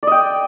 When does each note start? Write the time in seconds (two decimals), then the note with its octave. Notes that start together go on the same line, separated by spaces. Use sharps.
0.03 D5
0.07 D#5
0.12 G5